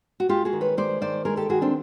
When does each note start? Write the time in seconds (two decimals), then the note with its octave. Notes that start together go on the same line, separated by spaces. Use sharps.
0.20 F#4
0.29 G#3 F4 G4
0.45 F#4 G#4
0.53 D#3
0.61 B4 C#5
0.77 G#3 C5 D5
1.01 D#3 C5 D5
1.25 G#3 G#4 A#4
1.37 G4 A4
1.49 D#3 F#4 G#4
1.61 C4 D4